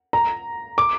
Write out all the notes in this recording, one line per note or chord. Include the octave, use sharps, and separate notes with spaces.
A#5
D6